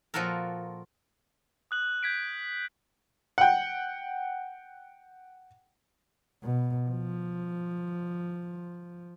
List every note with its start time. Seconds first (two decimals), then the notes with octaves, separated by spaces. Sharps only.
0.14 A#2 F3 F4 F#4 A4 A#4
1.71 D#6 F#6 F#7
2.03 G6 G#6 B6 D7
3.38 F#5 G5
6.43 B2
6.89 F3